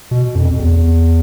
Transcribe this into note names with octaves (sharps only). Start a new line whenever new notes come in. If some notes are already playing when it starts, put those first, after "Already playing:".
B2
F2
F2
E2